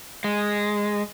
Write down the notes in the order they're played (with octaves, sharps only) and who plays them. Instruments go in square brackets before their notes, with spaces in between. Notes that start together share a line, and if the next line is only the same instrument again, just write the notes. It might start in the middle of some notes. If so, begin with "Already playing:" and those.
[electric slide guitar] G#3